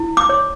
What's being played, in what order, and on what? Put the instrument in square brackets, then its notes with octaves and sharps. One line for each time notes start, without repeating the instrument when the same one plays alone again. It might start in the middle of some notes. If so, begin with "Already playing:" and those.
Already playing: [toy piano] E4
D6
C#5